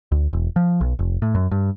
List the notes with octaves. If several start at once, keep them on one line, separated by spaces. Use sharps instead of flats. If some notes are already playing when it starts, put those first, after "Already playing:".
D2
E1
F3
B1
F1
A2
F#2
G2